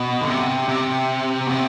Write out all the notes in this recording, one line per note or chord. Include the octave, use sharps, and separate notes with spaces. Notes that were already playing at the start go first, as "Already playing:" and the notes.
Already playing: B2
D3
C3
C3
B2
C3